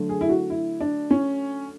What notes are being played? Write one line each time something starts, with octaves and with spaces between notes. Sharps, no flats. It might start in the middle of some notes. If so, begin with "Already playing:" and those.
Already playing: D3 F#3 A3
G#4
E4
F#4
E4
D4
C#4